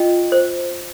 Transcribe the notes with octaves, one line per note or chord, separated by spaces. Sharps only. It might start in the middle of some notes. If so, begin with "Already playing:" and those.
Already playing: F4 D#5 G5
C5